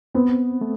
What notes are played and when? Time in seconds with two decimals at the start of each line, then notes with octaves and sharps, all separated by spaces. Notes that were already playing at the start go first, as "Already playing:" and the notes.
0.15 B3 C4
0.61 A3